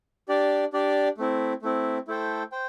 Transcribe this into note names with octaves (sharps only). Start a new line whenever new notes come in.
D4 G4 D5
D4 G4 D5
A3 C4 E4
A3 C4 E4
A3 E4 A4 C5 G5
C5 G5